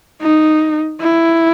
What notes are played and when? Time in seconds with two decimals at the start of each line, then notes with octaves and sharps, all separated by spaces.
0.22 D#4
1.00 E4